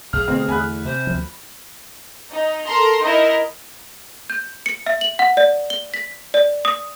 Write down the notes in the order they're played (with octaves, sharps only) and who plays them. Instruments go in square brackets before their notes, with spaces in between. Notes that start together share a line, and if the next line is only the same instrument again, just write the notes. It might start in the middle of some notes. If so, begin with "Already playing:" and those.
[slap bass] B1 [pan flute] G#4 [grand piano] F6
[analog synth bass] B2 [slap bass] D3 A3 [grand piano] C4
[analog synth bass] E2 [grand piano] G#5 B5 F#6
[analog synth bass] C3 [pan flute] C5
[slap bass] D2 F3
[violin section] D#4
A4 A#4 A#5 C6
D#4 E4 A#4 D#5
[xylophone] G6
C#7
E5
F#7
F#5
D5
G7
B6
D5
D#6